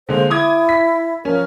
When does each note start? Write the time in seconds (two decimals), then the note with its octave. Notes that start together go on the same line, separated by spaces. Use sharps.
0.09 D3 G#3 A#3 C5
0.30 E4 D6 D#6 G#6
0.69 B6
1.25 F3 C#4 A#4